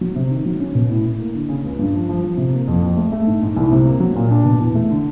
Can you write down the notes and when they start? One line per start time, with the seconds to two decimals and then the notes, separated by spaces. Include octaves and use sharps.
0.01 F#3
0.16 C3
0.31 D#3
0.46 F#3
0.60 C#4
0.75 B2
0.89 A2
1.05 A2
1.19 A#3
1.35 D3
1.49 C#3
1.65 C#2
1.79 G2
1.93 F3
2.09 F3
2.23 F3
2.37 C3
2.53 A#3
2.68 F2
2.82 F2
2.97 A3
3.12 A3
3.27 G#2
3.42 G#2
3.57 C2
3.72 C3
3.86 A#3
4.00 F#3
4.16 A#2
4.30 D4
4.46 B2
4.60 E2
4.75 A3
4.90 D3